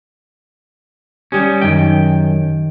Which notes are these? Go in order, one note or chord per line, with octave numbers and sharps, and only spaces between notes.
G3 C#4 G4 D#6 G6
F#2 D#3 G5